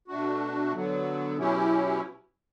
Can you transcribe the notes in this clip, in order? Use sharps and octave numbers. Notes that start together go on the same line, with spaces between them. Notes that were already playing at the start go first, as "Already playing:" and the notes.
B2 A3 D4 F#4
D3 F#3 B3
B2 F#3 C#4 E4 G4